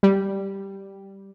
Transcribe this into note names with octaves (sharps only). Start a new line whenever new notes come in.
G3